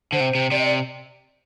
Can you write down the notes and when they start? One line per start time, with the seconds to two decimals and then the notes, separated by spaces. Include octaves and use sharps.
0.13 D3 C5
0.20 C3
0.35 C3
0.51 C3 D5
0.59 D#5
0.65 D5